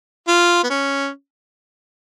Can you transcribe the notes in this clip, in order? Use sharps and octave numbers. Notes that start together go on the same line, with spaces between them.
F4
B3
C#4